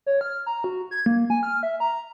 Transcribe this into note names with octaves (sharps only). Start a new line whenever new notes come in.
C#5
F6
A#5
F#4
G#6
A#3
G#5
F6
E5
A#5